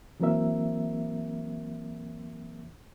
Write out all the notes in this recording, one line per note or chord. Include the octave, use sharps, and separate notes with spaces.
E3 F#3 A#3 C4 A#4 E5